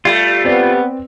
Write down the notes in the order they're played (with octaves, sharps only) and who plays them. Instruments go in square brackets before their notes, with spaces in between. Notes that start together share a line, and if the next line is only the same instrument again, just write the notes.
[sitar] G3 A3 [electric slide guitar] F4
[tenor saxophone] B3 [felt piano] C4 B4 D5